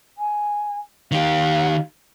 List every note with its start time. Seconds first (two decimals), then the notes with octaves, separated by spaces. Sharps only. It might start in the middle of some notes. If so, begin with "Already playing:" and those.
0.18 G#5
1.12 D#3 G4 F5